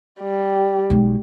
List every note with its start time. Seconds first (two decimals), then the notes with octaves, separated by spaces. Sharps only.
0.21 G3
0.90 B1 G#3